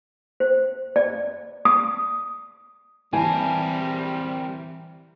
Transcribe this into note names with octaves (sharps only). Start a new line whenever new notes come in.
C5
D5
D#6
E3 G3 C4 A#4 G#5 A5